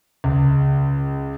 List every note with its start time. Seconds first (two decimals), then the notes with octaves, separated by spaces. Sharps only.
0.24 C#2